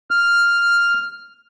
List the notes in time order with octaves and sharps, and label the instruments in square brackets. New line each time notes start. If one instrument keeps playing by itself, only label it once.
[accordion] F6